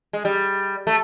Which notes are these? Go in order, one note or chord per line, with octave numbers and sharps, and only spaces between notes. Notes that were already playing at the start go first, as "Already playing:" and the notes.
G#3
G3
A3